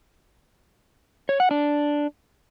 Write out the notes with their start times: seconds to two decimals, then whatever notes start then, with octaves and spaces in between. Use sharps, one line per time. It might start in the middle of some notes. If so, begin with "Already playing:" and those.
1.29 C#5
1.40 F#5
1.51 D4